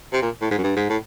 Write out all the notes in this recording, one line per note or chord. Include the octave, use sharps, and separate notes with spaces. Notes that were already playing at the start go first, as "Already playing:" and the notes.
C3
A#2
A2
G#2
F#2
G2
G#2
A2